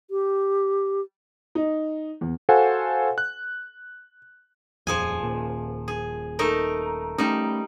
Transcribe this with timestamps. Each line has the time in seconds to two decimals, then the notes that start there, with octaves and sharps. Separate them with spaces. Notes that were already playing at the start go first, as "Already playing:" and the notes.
0.11 G4
1.55 D#4
2.21 E2
2.49 F#4 A4 C5 F5 F#5 G#5
3.18 F#6
4.87 D#1 F2 F3 G#4 G#5
5.23 D#1 A#2
5.88 G#4
6.39 A3 D#4 A#4
7.18 G3 A3 C#4 D#4